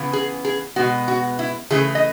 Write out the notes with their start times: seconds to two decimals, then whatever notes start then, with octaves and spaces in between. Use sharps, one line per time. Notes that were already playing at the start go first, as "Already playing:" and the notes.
Already playing: C#3 E3 B3
0.13 G#4
0.45 G#4
0.76 B2 G#3 B3 F#4
1.08 F#4
1.39 E4
1.70 C#3 E3 A3 G#4
1.95 D#5